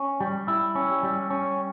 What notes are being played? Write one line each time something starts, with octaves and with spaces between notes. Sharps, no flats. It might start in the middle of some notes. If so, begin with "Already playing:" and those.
Already playing: C#4
G3
E4
C#4
G3
C#4